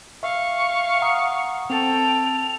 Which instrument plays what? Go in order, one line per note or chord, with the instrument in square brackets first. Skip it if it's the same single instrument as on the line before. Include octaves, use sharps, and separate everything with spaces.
[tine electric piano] E5 [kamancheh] F5 [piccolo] C#6
[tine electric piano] F#5 A#5 D#6
[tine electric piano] C4 [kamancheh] A4 G5 [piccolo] F7